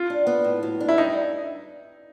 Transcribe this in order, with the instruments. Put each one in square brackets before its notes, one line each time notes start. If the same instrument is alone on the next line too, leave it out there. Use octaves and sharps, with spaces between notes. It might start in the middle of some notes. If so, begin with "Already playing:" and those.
Already playing: [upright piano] F4
[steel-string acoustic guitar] D4
B3
A2
F#3
D4
[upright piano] E4
[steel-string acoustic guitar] G3 [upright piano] D#4